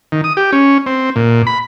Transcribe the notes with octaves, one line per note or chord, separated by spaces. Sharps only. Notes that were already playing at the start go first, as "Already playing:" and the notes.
D#3
D#6
G4
C#4
C4
A#2
B5